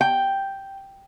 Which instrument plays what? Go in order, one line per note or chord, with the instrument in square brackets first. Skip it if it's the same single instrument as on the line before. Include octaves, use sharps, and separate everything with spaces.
[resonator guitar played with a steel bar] G5